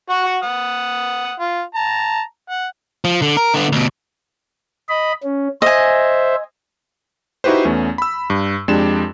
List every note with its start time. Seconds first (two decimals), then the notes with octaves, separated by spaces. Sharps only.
0.10 F#4 F#5 C#6
0.43 F#5 D#6
1.40 F4
1.75 A5 A#5
2.50 F#5
3.04 F3
3.22 D3
3.37 A#4
3.54 D3 B3
3.72 D2 B2
4.89 D#5 B5
5.23 C#4
5.62 C5 D#5 E5 G#5
7.44 D#4 E4 F#4 G4 B4 C5
7.65 E2 A3 B3 C#4
7.98 B5 E6
8.30 G2
8.68 F2 G#3 D4 G4 E7